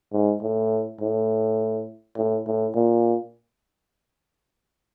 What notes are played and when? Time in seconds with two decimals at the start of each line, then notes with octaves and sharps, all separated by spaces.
0.13 G#2
0.42 A2
1.01 A2
2.17 A2
2.46 A2
2.75 A#2